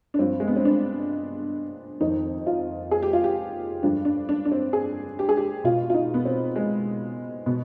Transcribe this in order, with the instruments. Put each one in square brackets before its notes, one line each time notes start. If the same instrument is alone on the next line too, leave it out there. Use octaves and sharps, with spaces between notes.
[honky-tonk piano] D4
G2 F3 C4
G#3
B3
C4
D4
F2 D#3 D#4
F4
G#4
G4
F4
G4
G2 D3 F3 D4
D4
D4
D4
C4
G#4
G4
G#4
G4
B2 F4
F4
D#4
B3
C4
G#3
B2 B3